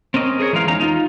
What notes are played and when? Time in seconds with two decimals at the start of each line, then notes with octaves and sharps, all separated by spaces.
0.14 C4 C#4 A#4 D#5
0.40 G#4 A#4 C5 C#5
0.53 E3 G#3 A#4 F5
0.67 E2 C#4 D#4 A#5
0.80 D#4 F4